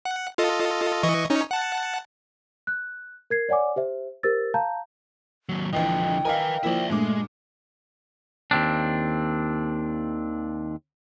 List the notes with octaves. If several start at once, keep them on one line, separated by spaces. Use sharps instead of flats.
F#5
F4 A4 D#5
E3 D#5 C#6
C#4 D#4 C#5
F#5 A5
F#6
A#4 G#6 C7
C#5 D5 F#5 G#5 D6
G4 C5 E5
G4 A#4 C5 E6 A6
F5 A5 A#5 G6
D#2 F#3
A#1 D3 E3 F3 D#5 G5
A#4 B4 D#5 F5 G#5
F3 A#3 E4 D5 E5
G2 A#2 G#3 A3 D6
D#2 C4 D4